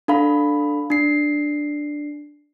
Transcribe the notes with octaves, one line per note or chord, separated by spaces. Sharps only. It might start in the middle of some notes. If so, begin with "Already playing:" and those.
D4 A4 F5 B5
D4 C7